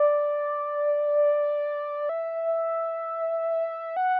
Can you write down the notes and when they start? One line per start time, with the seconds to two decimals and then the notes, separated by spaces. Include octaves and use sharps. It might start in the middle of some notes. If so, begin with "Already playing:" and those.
Already playing: D5
2.09 E5
3.97 F#5